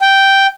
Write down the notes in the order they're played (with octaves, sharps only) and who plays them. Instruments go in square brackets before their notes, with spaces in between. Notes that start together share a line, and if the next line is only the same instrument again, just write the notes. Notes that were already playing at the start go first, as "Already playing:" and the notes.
[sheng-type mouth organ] G5